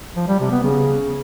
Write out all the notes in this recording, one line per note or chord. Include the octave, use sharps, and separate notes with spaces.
F3
G3
C3
B3
C#3